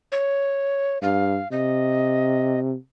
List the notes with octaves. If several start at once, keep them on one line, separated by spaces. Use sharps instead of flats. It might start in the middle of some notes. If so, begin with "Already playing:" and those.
C#5
G2 F5
C3 D#5